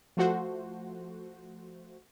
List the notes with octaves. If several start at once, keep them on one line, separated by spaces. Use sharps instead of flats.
F3 A3 F#4 C5